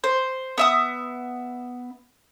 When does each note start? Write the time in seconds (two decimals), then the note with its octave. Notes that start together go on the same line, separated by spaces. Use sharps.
0.04 C5
0.58 B3 E5 D#6